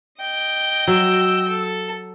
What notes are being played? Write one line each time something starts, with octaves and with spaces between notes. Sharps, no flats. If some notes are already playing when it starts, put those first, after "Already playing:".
D#5 G5
F#3 E6
A4